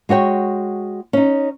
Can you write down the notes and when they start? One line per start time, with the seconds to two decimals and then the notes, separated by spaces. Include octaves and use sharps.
0.09 G#3 F#4 C#5 G5
1.13 C#4 D#4